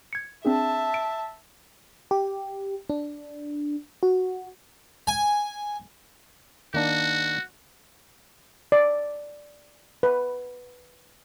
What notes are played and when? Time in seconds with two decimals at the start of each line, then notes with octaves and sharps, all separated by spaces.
0.13 G#6 C#7
0.45 C4 D4 G#4 E5 A5
0.94 D7
2.11 G4
2.90 D4
4.03 F#4
5.07 G#5
6.74 D#3 A#3 D4 F#4
8.72 D5
10.03 B4